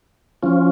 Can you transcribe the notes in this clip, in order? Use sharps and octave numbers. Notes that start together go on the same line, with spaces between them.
F3 C#4 F4